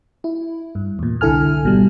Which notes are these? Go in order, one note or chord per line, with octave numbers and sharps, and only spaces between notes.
E4
G2
E2 A#2
C2 D3 E4 A4 G#5 F6
G#1 B2 G3